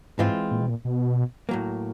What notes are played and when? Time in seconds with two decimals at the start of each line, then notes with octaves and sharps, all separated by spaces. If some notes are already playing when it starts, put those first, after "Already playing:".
0.19 G#2 E3 G#3 C4 F4
0.51 A#2
0.61 B2
0.70 A#2
0.85 B2
1.49 A2 F#3 A#3